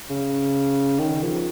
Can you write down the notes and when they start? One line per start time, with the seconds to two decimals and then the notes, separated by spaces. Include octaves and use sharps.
0.10 C#3
0.99 D#3
1.22 F3